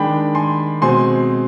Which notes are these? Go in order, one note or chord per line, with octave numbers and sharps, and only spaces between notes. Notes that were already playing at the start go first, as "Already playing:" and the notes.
Already playing: D#3 G#3 D4 G5 B5
G#5 C6
B2 G#3 C4 G#5 C6